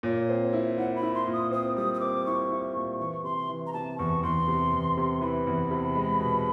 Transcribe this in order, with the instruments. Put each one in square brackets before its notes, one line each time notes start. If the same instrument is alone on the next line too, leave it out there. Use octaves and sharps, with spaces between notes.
[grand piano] A#2 [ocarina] C#5
[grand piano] C4
E4
[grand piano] E4 [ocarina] F#5
[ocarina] B5
[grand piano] E4
[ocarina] C6
[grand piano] A#2
[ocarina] D#6
[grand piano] C4 [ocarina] D#6
[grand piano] G3 [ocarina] D#6
[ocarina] D#6
[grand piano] C4 [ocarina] D6
[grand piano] E4 [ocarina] C#6
[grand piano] E4
A#2
[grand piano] E3 [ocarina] C#6
[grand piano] C3 [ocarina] C6
[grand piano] E3
[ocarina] A#5
[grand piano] C3 [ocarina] A5
[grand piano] E2 [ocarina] C#6
[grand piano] E2 [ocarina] C6
[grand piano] C3
E2
C3
[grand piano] E3 [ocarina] B5
[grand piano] E2
C3
G#3
B2